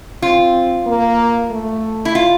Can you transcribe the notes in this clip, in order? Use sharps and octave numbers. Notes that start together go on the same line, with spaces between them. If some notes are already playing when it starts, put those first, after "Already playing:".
C4 F4
A#3
A3
E4
F4